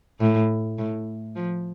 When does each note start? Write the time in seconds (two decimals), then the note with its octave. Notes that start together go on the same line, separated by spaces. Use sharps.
0.20 A2
0.78 A2
1.36 F3